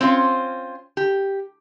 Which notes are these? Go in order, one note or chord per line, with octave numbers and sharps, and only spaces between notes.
C4 C#4 F4 C5
G4